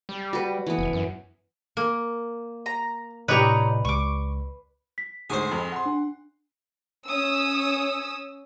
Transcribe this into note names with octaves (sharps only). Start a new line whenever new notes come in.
G3
F#4 B4
E3 B3
F1
F#2
A#3
A#5
A2 C3 D4 D#4 G4 B4 C#5 A#5
C#2 C#6 D6
B6
D2 G#2 G#4 C5 C#6
F2
F#5 C6
D4
C#4 D#6 E6